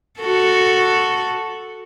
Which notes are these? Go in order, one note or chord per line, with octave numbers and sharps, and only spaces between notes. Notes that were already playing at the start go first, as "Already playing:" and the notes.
F#4 A4